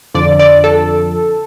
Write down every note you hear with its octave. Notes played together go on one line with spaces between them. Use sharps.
F2 D3 F3 D5
D5
A4